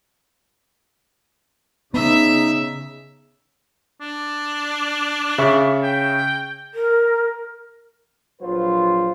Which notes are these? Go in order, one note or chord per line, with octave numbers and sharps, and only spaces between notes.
C#3 B3 D#4 E5
D4
C#3 E5 C#6
G5
A#4
A#1 F#3 F4 B4 C5